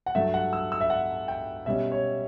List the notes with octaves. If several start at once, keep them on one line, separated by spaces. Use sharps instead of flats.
F#5
G2 F#3 A3 E5
F#5
E6
E6
E5
F#5
G5
B2 G3 C#4 E5
C#5